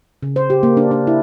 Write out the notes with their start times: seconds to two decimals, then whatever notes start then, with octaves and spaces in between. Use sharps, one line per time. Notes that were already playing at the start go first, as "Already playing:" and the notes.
0.23 C#3
0.36 C5
0.50 G4
0.63 A#3
0.77 D4
0.91 D4
1.07 E4